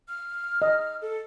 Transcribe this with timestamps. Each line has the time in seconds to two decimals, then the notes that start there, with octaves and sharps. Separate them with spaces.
0.09 F6
0.62 D#5
1.02 A4